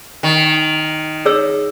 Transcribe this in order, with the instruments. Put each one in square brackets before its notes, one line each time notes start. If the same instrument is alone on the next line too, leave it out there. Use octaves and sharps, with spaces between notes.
[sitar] D#3
[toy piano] G#4 C#5 E6